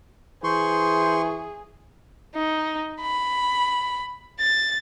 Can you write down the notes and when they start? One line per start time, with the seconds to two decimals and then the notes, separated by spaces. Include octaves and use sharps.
0.44 E3 G#4 C5 C6 C#6
2.35 D#4
3.01 B5
4.40 A6